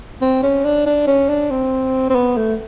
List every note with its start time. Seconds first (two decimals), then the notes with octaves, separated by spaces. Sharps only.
0.22 C4
0.43 C#4
0.65 D4
0.86 D4
1.07 C#4
1.29 D4
1.50 C4
2.10 C4
2.15 B3
2.37 A3